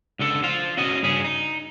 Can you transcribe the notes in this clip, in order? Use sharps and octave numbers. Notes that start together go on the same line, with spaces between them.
C#2 D3 A4
F4 C5 F5
C#4 F#4 D#5
G2 C#3 C#4 G#4
D#4